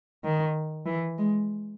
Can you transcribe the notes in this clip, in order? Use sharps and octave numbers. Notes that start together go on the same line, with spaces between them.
D#3
E3
G#3